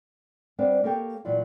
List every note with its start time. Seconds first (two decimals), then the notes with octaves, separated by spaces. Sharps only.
0.58 G3 B3 C4 D4 C5 F5
0.84 A#3 G4 A4 C#5 G5
1.25 A#2 E3 F#3 G3 F4